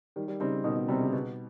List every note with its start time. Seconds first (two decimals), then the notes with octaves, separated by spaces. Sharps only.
0.16 D#3 G3
0.28 G3
0.40 C#3 G3 C4 D#4
0.64 B2 D#3
0.76 B2
0.88 C3 G3 C4 D#4
1.01 C#3
1.13 B2